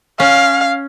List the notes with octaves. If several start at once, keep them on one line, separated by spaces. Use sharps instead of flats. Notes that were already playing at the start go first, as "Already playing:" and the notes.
C#4 F5